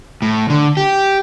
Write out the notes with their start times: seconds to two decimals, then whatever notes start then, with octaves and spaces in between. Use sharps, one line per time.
0.22 A2
0.50 D3
0.77 G4